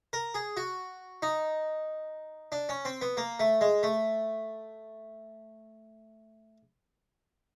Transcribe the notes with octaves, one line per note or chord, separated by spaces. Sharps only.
A#4
G#4
F#4
D#4
D4
C#4
C4
B3
A#3
A3
G#3
A3